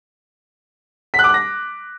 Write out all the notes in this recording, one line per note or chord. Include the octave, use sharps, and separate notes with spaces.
B6
F#6
D6
F#6
A#6